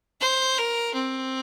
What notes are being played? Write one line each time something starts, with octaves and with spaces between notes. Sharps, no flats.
C5
A#4
C4